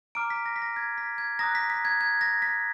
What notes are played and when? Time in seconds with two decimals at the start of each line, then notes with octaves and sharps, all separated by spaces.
0.15 A#5 D6 F6 D7
0.30 B6
0.46 A#6
0.56 B6
0.62 A#6
0.76 G#6
0.98 B6
1.18 G#6
1.39 A#5 D#6 F#6 A#6
1.55 B6
1.70 B6
1.85 G#6
2.01 G#6
2.21 A#6
2.42 B6